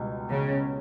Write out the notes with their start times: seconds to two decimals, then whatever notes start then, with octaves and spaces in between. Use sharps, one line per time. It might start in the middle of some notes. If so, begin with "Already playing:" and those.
Already playing: C#2 B2 G3
0.30 C#3